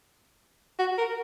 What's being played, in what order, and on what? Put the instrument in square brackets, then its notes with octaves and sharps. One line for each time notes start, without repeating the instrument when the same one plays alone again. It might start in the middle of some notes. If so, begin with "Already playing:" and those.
[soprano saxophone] F#4
A#4